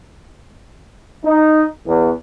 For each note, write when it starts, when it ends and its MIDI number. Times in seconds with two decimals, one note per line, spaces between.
1.25 1.64 63
1.86 2.11 40